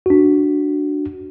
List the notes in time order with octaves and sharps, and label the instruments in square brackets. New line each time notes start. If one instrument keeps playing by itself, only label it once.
[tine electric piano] D4 F#4